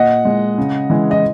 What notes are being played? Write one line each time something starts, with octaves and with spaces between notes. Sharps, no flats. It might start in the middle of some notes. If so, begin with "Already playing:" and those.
Already playing: A#2 D#5 F#5
G#3
C#3
E3 G#3
D#5